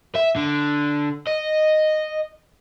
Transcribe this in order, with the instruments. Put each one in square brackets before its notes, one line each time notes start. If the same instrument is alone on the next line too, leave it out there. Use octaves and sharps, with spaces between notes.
[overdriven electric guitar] E5
D3
D#5